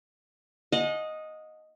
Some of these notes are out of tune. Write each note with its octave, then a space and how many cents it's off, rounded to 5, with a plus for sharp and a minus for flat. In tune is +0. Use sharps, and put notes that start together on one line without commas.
D#5 +0 F#5 -40 A5 -45